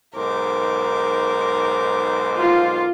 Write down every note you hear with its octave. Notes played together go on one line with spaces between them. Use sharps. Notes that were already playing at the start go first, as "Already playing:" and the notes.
B1 G#2 A#4 C5 D6
F4